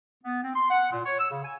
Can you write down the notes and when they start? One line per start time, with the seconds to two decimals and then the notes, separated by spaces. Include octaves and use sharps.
0.24 B3
0.43 C4
0.55 C6
0.70 F#5
0.92 A#2
1.05 C#5
1.19 E6
1.31 C#3
1.44 G#5